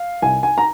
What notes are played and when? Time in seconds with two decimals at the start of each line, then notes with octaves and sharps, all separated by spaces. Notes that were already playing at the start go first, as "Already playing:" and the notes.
Already playing: F5
0.22 C2 G#5
0.43 G#5
0.58 A#5